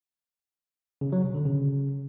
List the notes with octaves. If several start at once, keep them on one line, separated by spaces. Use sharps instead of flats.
C#3
F#3
B2
D3
C#3